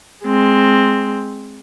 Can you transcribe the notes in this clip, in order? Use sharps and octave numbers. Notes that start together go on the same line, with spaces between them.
G#3 C4